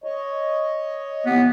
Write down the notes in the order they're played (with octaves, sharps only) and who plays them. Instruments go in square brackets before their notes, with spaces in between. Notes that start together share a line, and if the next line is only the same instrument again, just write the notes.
[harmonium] C#5 D#5
[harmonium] A2 G4 [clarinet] B3